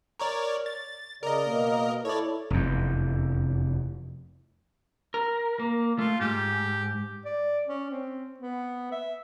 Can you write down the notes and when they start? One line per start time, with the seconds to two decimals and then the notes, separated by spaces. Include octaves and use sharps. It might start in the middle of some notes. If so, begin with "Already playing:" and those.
0.20 A#4 C#5 D5
0.66 A6
1.23 C#3 A#4 D5 D#5
1.46 B2 A#3
2.05 E4 A4 C#5 D5
2.50 F1 E2
5.14 A#4
5.59 A#3
5.99 A3 F4
6.20 G#2 G4
7.25 D5
7.67 C#4
7.91 C4
8.38 B3
8.92 E5